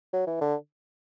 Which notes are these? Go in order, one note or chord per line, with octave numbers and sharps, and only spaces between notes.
F#3
E3
D3